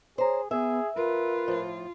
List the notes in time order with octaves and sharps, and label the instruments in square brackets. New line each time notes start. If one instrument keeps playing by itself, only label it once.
[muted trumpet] G#4 [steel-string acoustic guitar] C5 A#5 [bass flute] C#5
[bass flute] B3 [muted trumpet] G#4 [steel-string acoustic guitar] E5
[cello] F4 [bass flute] A#4 [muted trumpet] B4
[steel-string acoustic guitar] A2 F3